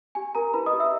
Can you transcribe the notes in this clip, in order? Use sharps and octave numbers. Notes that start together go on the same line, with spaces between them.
G4 G#5
A#4 A#5
E4 B4 B5
D#5 D#6
G4
E5 E6